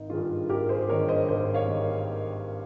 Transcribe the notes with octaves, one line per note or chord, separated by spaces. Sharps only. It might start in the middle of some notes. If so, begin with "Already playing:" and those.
Already playing: G#1 D#4
G2 D#3 F4 G#4
G#1 G4 A#4
G#4 C5
G2 D#3 A#4 C#5
C5 D#5
G#1 C5 D#5
C#5 F5
D#3